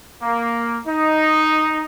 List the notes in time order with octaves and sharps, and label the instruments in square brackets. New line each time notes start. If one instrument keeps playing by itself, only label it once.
[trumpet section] A#3
D#4